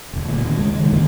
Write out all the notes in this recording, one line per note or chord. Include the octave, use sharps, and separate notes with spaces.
E1 D2
D2 A#2
D#2 A#2 C#3
C#3 G#3
C3 D#3
F#2 D3 D#3 A#3